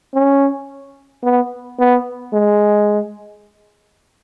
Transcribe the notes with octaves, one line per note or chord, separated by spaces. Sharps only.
C#4
B3
B3
G#3